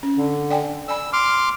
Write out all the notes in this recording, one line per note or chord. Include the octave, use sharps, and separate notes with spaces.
C#4
D3
D5 G5 G#5
D5 G#5 B5 E6
C6 D6 F6